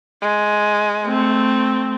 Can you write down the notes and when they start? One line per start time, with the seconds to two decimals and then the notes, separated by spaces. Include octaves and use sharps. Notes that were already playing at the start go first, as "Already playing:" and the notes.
0.22 G#3
1.04 A3 C4